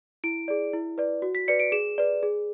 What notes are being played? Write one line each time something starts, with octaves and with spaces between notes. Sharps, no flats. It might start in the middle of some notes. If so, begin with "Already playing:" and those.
E4 D7
G#4 D5
E4
B4 D5
F#4
B6
B4 D5 C#7
D7
G#4 E7
B4 D5
G#4